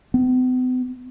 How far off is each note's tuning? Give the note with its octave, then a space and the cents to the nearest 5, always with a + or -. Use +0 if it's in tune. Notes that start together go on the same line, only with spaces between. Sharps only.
B3 +45